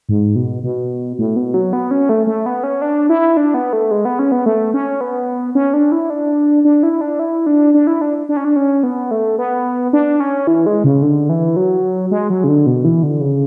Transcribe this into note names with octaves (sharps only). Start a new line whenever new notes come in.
G#2
B2
B2
A2
B2
F#3
B3
C#4
A3
A3
B3
C#4
D4
E4
D4
B3
A3
G#3
B3
C#4
B3
A3
C#4
B3
C#4
D4
E4
D4
D4
E4
D4
E4
D4
D4
E4
D4
D4
C#4
D4
C#4
B3
A3
B3
D4
C#4
E3
G#3
C#3
D3
E3
F#3
G#3
F#3
C#3
D3
B2
E3
D3
C#3